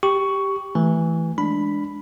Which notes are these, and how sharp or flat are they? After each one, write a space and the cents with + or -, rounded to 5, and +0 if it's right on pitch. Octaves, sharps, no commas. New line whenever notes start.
G4 +0 C#6 +10
E3 +0 A3 +0 G#5 -15
G#3 +0 D4 +0 B5 +0